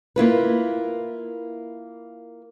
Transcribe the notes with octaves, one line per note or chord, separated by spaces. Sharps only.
A#3 E4 F4 B4